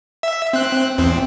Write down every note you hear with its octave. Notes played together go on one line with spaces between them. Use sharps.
E5
C4 F#6
E2 C4